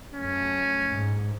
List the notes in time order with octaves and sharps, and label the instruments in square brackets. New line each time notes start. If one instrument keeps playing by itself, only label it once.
[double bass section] F#2 A3 [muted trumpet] C#4
[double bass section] G#2